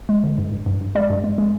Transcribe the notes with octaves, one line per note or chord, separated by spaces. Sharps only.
G#3
D3
G2
G2
G2
G2
G#3 D5
G2
G#3
G#3